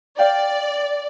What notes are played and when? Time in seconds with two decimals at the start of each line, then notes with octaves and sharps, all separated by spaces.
0.19 D5 F5 G5